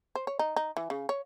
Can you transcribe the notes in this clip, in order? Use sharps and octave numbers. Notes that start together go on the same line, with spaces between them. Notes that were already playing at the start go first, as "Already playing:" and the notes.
C5
C#5
D#4
D#4
E3
C#3
C#5